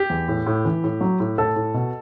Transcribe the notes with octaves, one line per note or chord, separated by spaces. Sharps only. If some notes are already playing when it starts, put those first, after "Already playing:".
Already playing: G4
E2
A2
A2
E3
A2
F#3
A2
A2 A4
A2
B2